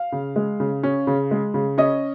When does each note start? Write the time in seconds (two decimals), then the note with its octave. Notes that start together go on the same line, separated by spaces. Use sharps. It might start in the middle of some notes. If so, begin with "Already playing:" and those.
Already playing: F5
0.12 C#3
0.36 G#3
0.60 C#3
0.83 C#4
1.07 C#3
1.31 G#3
1.54 C#3
1.78 C#4 D#5